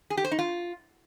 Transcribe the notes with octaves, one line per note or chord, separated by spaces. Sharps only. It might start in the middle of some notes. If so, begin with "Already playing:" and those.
G#4
G4
C5
D#4
F4